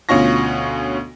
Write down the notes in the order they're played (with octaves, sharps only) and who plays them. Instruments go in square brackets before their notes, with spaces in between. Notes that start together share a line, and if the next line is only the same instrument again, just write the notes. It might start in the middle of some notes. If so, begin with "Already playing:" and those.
[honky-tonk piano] D2 B2 C#4 F4 C#6 A#6